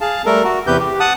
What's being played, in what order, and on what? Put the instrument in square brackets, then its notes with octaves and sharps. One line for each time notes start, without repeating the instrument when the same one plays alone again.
[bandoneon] G#4 F5 A5
G3 A3 A4 A#4
F#4
E2 C3 G4 B4 G6
G4
F#5 A5 D#6